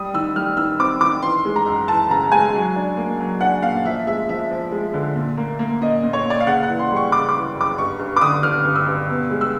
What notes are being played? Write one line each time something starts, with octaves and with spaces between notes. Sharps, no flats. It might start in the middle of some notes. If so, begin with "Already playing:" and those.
Already playing: G3 D#6
D#3 E6
G3 F6
D#3 E6
C4 D6
D#3 D6
E3 C6
G#3
A#5
F#2
E3 A5
C#3 A#5
G#3 G#5
F#3
D4
A#3
F#3
D4 F#5
A#2 F5
F3 E5
G#3 E5
F3 E5
F3
G#3
D3
A#2
A#3
A#3
A#2 D#5
A#2
C#5
A#2
D5
F5
C#3 F#5
F#5
E3
C6
G3
C#6
C#3 D6
D6
E3
F#2
D6
G2 C#6
G2
D6
D3 D#6
D3 F6
G2
E6
G2
B2
G#3
E6